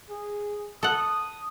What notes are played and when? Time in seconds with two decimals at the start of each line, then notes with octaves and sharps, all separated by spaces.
0.10 G#4
0.83 A4 F#5 D#6